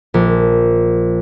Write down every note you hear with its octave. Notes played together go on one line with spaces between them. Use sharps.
A#1